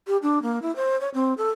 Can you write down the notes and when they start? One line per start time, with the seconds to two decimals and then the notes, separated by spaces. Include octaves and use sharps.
0.07 G4
0.22 D4
0.42 A#3
0.62 E4
0.76 C5
1.01 C#5
1.14 C4
1.38 A4